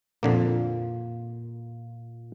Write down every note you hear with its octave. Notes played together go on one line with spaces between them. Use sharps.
F2 A#2 D3 A#3